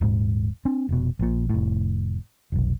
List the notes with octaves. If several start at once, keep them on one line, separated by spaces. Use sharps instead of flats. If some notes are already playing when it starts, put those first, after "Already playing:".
D#1 G#2
C4 D4
F1 B2
A#1 A#2
F1 A2
F1 B1